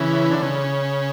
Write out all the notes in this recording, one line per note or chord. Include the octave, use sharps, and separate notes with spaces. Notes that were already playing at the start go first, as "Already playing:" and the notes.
Already playing: C#3 E3
D3
C#3